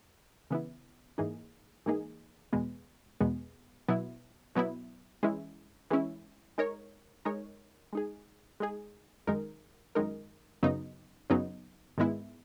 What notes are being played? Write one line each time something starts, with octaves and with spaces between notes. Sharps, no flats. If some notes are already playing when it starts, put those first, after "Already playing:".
C#3 E3 B3 E4
G#2 E3 A#3 D#4 G#4
G#2 E3 A#3 D#4 G#4
E2 B2 G#3 B3
E2 B2 G#3 B3
B2 F#3 B3 E4
B2 F#3 B3 E4
E3 G#3 C#4 E4
E3 G#3 C#4 E4
G#3 D#4 A#4 C#5
G#3 D#4 A#4 C#5
G#3 D#4 G#4
G#3 D#4 G#4
F#2 D#3 G#3 D#4 A#4
F#2 D#3 G#3 D#4 A#4
F#2 C#3 F#3 B3 D#4
F#2 C#3 F#3 B3 D#4
G#2 D#3 G#3 B3 E4